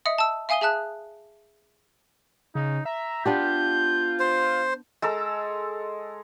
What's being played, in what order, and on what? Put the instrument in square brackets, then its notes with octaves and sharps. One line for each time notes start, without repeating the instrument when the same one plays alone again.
[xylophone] D#5 E5 D#6 C#7
A5 E6
E5 F5 G#5 D#6 D#7 G7
G#4 E5 A5 F#6
[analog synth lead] C#3 [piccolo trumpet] D#4
[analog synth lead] E5 [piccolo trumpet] A#5
[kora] B3 D4 G4 [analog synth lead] F4 [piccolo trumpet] G6
[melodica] C5
[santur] G#3 A4 A#5 E6